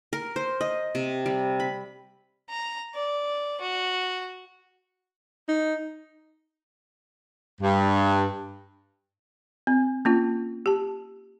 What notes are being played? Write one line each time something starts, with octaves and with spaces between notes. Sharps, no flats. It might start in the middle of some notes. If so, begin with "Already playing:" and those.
A#4
C5
D#5
C3
G3
B5
A#5
D5
F#4
D#4
G2
C4
A#3 C#4 F4
G4 A5